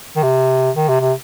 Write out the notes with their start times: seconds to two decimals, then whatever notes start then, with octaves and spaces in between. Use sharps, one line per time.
0.16 D#3
0.23 C3
0.76 D#3
0.89 C3
1.01 C3